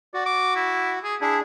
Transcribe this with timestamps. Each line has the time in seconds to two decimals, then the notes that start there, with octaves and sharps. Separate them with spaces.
0.14 F#4 D5
0.26 D6
0.56 E4
1.04 G#4
1.21 D4 E4 G#4